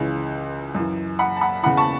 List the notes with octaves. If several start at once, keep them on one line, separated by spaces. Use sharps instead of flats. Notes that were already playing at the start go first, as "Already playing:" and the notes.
Already playing: C#2 C#3 E3
F#2 E3
F#5 B5
A5
F#5 B5
E2 C#3 E3 F#5 B5
A5 C#6